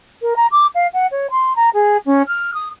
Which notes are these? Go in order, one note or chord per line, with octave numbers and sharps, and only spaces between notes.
A#4
A#5
D6
F5
F#5
C#5
C6
A#5
G#4
C#4
F6
D#6